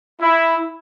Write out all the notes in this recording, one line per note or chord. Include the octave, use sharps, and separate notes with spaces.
E4